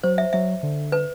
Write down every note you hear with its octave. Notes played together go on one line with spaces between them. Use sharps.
F#3 C5
E5
F#3 E5
D3
B4